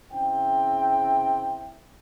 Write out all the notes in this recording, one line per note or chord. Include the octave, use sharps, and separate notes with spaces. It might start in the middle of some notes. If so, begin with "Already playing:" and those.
C#3 C4 E4 G5